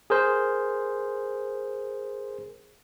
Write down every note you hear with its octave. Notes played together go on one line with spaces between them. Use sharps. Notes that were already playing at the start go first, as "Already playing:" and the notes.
G#4 A#4 C5